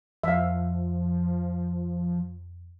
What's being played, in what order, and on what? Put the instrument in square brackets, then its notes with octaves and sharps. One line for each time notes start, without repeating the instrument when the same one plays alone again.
[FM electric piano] F2 [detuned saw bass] F3 [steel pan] E5 F5